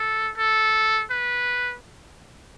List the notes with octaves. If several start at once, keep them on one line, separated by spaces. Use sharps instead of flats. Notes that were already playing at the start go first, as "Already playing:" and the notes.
Already playing: A4
A4
B4